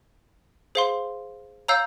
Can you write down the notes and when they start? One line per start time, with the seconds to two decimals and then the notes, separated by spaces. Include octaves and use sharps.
0.75 G#4 C5 F5 C6
1.68 C#5 F5 A#5 E6 G6